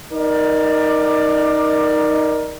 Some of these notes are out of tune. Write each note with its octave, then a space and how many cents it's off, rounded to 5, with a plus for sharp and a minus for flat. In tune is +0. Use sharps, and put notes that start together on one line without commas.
D#4 +5 A#4 +15 D5 +20